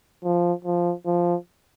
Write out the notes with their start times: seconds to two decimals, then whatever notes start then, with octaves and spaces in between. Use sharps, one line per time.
0.24 F3
0.65 F3
1.06 F3